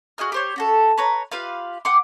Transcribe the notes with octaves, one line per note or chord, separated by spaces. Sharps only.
F#4 G#4 D#5 F6
G4 C5 C#5
C#4 F#4 A4
B4 C#5 A#5
F4 G4 B4 F5
F#5 G5 C6 D6